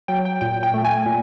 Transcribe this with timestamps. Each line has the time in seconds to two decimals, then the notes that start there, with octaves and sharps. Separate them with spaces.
0.08 F#3 G5
0.25 G5
0.41 A#2 G5
0.63 G5
0.74 A3
0.85 G#5
1.06 A#2